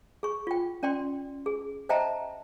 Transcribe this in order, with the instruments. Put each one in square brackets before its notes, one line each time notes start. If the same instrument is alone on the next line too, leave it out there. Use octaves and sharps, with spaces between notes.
[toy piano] G#4 C#6
F4 G5
C#4 D5 G5 C6
G#4
C5 D#5 E5 G5 A5 A#5